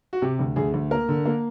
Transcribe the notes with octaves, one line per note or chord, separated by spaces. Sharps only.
F#4
C3 G4
D2
D2 G#4
D2
A#3 A#4
D3
A#3